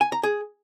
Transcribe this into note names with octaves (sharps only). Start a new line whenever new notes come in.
G#5
A#5
G#4